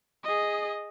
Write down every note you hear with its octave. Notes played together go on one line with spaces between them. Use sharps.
G#4 D#5